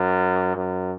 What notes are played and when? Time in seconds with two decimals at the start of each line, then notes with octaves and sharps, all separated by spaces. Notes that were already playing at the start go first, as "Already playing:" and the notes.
Already playing: F#2
0.56 F#2